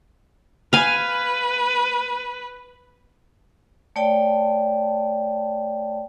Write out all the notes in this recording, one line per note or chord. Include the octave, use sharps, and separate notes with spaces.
B4 F5 G#5
A3 C#5 D5 G5 A5